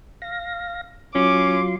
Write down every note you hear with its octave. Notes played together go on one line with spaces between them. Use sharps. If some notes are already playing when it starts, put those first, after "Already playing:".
F5 A#6
F#3 C#4 F4 C6 D6